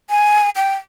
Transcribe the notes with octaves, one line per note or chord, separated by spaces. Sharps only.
G#5
G5